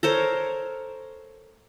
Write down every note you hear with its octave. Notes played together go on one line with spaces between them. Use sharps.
A4 A#4 C5 C#5